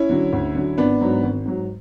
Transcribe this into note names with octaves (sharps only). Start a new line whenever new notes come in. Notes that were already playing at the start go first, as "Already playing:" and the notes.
Already playing: C#4 E4
D3 F#3
D2
D3 F#3
G#1 B3 D4
G#2 F#3
G#1
G#2 F#3